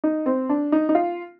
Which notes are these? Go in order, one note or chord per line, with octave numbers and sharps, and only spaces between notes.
D#4
C4
D4
D#4
D#4
F4